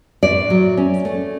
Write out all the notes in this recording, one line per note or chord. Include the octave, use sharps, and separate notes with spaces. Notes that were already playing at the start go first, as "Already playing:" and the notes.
A2 D5
F#3
C#4
A3